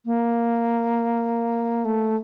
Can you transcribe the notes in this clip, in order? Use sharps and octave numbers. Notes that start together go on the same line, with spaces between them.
A#3
A3